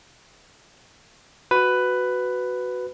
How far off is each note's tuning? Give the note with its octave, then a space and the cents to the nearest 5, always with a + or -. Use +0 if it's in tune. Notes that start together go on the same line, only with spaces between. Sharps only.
F#4 +0 B4 +10